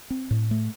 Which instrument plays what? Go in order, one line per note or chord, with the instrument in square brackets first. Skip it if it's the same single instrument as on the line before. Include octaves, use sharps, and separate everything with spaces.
[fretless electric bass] C4
A2
A3